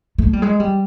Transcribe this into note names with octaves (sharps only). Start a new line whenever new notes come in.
A3
G3
G#3
G3